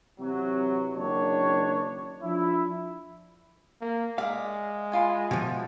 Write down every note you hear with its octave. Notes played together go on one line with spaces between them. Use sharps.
C3 E3 F#3
F#1 D#3 D4 C#5
F3 D4 E4
A#3
G#3 D5 E5 F5 A#5
E4 F4 G#5
B2 F3